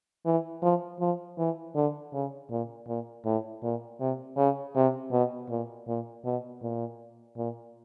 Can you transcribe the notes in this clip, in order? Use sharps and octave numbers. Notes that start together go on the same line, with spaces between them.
E3
F3
F3
E3
D3
C#3
A#2
A#2
A2
A#2
C3
C#3
C3
B2
A#2
A#2
B2
A#2
A#2